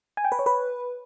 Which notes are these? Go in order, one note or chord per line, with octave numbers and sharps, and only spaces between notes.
G#5
G5
B4
C#5
B4